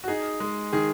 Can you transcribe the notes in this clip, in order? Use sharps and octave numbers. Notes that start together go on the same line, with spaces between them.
F#4
D#4 G#4
G#3
D#3 G#4